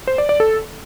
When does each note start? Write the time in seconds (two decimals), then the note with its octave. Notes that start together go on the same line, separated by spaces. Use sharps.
0.07 C5
0.18 D5
0.29 D5
0.40 A4